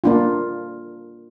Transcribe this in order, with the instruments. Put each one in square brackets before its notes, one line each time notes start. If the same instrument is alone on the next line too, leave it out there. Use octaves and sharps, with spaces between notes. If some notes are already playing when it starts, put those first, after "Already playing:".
[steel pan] A#3 D4 F4